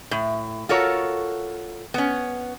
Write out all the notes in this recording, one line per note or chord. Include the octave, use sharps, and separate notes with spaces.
A2
F4 F#4 A4 A#4 C#5
B3 C#4